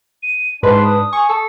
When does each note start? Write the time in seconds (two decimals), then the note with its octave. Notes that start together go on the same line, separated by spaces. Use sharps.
0.23 D#7
0.63 G#2 D4 B4 C6
0.84 D#6
1.13 G#5 C#6
1.29 A4